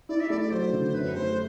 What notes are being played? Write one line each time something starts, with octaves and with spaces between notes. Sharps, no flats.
E4 D5
E5
A3 D5
D5
F#3 C5
D3
F#2 B4
A3 C5